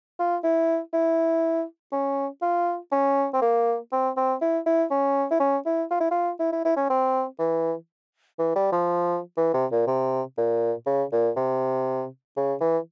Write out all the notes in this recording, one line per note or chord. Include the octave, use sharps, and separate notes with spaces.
F4
E4
E4
C#4
F4
C#4
C4
A#3
C4
C4
E4
E4
C#4
E4
C#4
E4
F4
E4
F4
E4
E4
E4
C#4
C4
E3
E3
G3
F3
E3
C3
A#2
C3
A#2
C#3
A#2
C3
C#3
E3